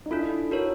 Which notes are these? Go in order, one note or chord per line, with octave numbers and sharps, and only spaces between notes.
D#4
D4 E4 F4 A4
D#4 F#4 A#4 C#5